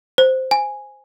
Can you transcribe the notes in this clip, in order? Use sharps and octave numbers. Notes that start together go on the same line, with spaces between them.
C5
G#5